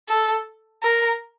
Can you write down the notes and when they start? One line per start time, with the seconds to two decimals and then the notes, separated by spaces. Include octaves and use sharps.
0.09 A4
0.83 A#4